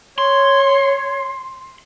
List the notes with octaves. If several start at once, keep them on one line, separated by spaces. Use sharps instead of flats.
C#5 C6